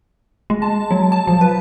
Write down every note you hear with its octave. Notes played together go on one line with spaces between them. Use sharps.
G#3
A5
F#3
A5
F3
B4